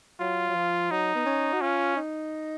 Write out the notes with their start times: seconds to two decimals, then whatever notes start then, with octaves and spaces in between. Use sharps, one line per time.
0.20 F#3 F4
0.49 F#3
0.55 F3
0.91 F#3 D#4
1.15 B3
1.26 C#4
1.53 F#4
1.61 C#4 F4
1.97 D#4